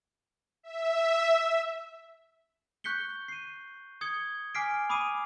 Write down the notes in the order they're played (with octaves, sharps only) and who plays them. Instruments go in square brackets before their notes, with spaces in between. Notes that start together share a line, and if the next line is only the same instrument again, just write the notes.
[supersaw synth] E5
[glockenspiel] C#6 F#6 G6 B6 C#7 G7
C7 D#7
D#6 G#6 C#7 G7
G#5 D6 F6 B6 C7 D7
B5 D6 D#6 C7 D#7